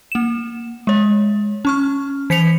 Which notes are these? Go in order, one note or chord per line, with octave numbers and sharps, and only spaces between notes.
A#3 E7
G#3 C#5
C#4 C#6 F6
E3 B6 C#7 F7